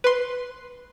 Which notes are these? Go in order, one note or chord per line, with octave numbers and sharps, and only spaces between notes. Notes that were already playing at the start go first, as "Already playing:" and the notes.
B4 C6